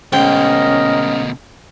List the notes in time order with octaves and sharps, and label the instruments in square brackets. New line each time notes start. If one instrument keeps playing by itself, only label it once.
[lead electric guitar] D2 B2 [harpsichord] G#2 G5 [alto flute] C#4 [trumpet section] A#4 D#5